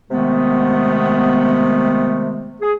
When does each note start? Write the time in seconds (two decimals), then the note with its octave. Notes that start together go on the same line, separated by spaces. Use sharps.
0.11 C3 D#3 G#3 A3 B3
2.62 G#4